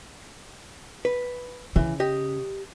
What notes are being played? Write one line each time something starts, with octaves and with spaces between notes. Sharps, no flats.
B4
C#3 E3
G4 D#5